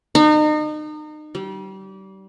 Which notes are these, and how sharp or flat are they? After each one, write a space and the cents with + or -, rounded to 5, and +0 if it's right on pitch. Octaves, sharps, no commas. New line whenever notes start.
D#4 -35
G3 -30